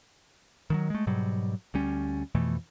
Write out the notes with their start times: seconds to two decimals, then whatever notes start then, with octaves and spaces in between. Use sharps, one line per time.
0.70 D#3 F3 F#3
0.90 G#3 A3
1.07 G#2 B2 F#3 G3
1.74 D2 G3 C#4
2.35 F2 B2 E3 A3